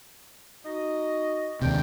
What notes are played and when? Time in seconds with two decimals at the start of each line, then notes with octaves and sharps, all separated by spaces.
0.65 D#4 F#4 D#5
1.62 D#2 C3 D4 G5